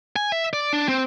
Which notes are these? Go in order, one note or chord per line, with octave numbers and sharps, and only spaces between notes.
G#5
E5
D5
D4
C4